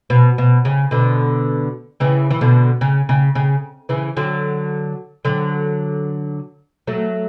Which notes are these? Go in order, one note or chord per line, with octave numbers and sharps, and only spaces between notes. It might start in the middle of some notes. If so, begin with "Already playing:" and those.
B2
B2
C#3
B2 D3
C#3 E3
E3
B2 D3
C#3
C#3
C#3
C#3 E3
D3 F#3
D3 F#3
F#3 A3